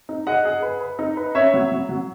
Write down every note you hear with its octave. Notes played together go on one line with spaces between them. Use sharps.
D#4
G#4 D#5 F#5
G#4
B4
B4
D#4
B4
C#4 C#5 E5
F#3
F#3
F#3